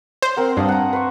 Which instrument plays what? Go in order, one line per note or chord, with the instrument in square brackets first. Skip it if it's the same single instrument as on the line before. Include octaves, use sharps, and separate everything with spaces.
[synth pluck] C5
[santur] C4 A#4 F#5
[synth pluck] G2 [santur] F5 A5 D#6
[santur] F#5 A#5
B4 C5 C#6